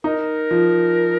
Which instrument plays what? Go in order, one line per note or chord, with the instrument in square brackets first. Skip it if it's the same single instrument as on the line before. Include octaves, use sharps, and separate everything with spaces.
[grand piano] D#4 [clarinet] A#4
[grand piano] F3